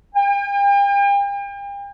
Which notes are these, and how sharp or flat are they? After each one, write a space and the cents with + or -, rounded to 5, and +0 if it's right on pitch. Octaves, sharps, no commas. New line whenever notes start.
G5 +40